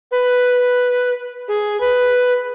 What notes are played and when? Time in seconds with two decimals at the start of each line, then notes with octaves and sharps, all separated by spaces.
0.11 B4
1.48 G#4
1.81 B4